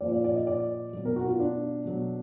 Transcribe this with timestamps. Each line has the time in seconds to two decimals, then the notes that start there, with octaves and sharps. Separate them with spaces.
0.01 A#2 F3 D5
0.12 D5
0.24 D5
0.35 D#5
0.47 D5
0.93 B2 F#3
1.05 A#4
1.16 F#4
1.27 F4
1.40 D4
1.85 B2 F#3